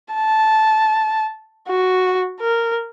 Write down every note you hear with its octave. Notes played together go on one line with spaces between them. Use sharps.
A5
F#4
A#4